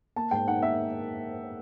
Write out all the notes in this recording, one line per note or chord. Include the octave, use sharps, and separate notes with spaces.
A#3 A5
G#2 G5
D#4 F#5
A#3 E5